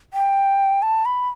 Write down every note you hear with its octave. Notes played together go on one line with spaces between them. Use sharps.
G5
A5
B5